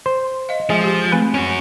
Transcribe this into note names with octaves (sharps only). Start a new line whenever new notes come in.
C5
D#5 F5
F3 G#3 G#4
G4
A3 C4 B4 G#5
C#4 F#4